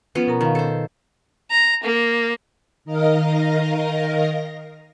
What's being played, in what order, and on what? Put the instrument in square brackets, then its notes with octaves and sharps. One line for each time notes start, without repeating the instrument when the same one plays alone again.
[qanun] F3 B3 C#4 [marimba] B4
[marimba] B2 A#4 A#5
[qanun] D#3 [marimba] F5 A#5
[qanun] A4 C5
[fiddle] A#5
A#3
[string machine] D#3 A#4 D#5 F5 A#6